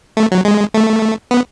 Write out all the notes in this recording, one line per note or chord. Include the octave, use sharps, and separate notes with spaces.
A3
F#3
G#3
A3
B3